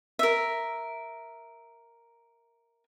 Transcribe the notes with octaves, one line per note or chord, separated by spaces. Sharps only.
A#4 E5